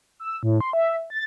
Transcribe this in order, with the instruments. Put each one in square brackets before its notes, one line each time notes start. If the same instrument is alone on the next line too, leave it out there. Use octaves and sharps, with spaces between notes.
[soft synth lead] E6
A2
C6
E5
A6